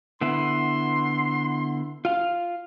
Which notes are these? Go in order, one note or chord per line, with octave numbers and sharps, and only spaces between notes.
D3 B3 E4 C6
F4 F5